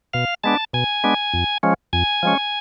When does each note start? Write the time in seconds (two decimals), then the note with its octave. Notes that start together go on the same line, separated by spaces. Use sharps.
0.13 B2 F5
0.44 G#3 B3 D4 A5
0.73 B2 G#5
1.04 G#3 B3 D4
1.33 F2
1.63 F3 G#3 C#4
1.93 F2 G#5
2.23 F3 G#3 C#4